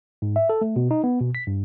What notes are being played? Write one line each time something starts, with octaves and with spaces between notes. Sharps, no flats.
G#2
E5
A4
A3
B2
D#4
B3
B2
B6
G2